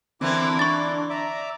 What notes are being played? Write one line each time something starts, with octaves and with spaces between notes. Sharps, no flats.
D3 E3 A#3 C4 E4 D6
D4 C#6 A6
D5 E5 A#5 D6